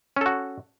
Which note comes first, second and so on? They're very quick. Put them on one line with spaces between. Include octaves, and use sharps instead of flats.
C#4 A4 F#4